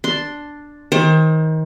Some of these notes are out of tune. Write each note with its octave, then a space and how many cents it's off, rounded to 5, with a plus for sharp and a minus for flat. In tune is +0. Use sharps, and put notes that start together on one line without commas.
D4 +0 C6 +0
D#3 +30 C5 +35